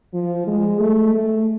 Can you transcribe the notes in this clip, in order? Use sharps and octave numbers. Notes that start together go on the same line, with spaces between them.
F3
G#3
A3
A3